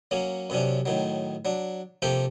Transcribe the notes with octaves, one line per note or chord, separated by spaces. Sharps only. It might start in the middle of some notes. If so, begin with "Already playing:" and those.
F#3 A#3 C#4
F#2 C3 C#4 D4
A2 D#3 F#3
F#3 D4
C3 F3 A#3 G4 A4 G5